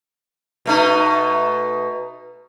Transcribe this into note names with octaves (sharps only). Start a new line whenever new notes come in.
B2 A3 D#4